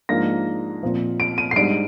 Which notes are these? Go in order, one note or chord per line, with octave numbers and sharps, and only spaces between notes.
G#2 F3 A#3 D4 A#6
A#2 F3 C4
D7
D#7
C7
G#2 G3 D4 D7